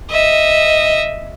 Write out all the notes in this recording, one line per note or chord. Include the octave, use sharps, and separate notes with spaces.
D#5 E5